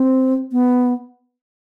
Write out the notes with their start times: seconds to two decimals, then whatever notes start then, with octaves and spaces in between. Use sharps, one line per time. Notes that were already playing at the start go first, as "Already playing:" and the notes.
Already playing: C4
0.52 B3